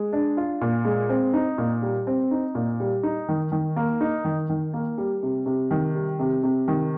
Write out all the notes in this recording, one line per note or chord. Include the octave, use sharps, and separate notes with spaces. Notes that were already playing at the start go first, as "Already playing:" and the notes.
Already playing: G#3
D4
F4
A#2
G#3
C4
D#4
A#2
G3
C4
D#4
A#2
G3
D#4
D#3
D#3
A#3
D#4
D#3
D#3
A#3
G3
C3
C3
D#3
G3
C3
C3
D#3